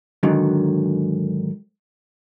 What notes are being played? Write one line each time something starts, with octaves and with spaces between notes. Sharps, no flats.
G#2 D3 D#3 F#3